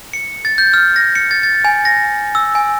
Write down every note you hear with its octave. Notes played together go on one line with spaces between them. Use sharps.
C#7
A6
G6
F6
A#6
C#7
A6
A6
G#5
A#6
E6
G#5